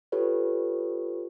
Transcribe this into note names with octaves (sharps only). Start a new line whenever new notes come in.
F4 G4 A4 B4 C#5